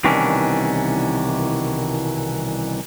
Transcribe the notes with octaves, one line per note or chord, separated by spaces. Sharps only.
C2 B2 D#3 E3 C#4 D4